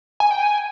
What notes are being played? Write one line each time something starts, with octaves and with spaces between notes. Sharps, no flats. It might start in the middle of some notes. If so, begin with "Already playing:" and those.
G#5
G5
G#5